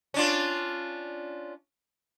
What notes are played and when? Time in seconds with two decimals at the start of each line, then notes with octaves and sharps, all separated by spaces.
0.14 C#4 D4 F4